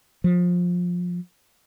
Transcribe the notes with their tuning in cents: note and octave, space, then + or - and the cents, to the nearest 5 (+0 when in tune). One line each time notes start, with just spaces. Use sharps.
F3 +20